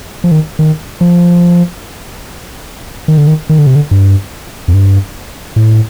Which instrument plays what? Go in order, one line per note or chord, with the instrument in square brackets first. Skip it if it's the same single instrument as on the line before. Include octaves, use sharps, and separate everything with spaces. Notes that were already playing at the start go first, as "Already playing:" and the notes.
[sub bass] F3
D#3
D#3
F3
D#3
D3
D#3
D#3
D3
C3
D3
G2
F2
G2
A2